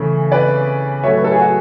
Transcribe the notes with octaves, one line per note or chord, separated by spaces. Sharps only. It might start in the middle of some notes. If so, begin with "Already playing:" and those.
Already playing: C#3 E3 A3
B4 D5
A2 F#3 A3 C#5 E5
B4
A4
G#4
F#4